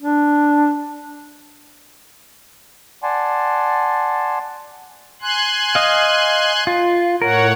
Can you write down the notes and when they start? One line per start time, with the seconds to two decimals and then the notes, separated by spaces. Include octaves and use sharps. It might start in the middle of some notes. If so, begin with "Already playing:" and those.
0.02 D4
3.03 D5 F#5 G#5 A5 C6
5.22 G#5 C6 F#6
5.75 D#5 F5
6.67 F4
7.22 A2 A#4 C#5 F#5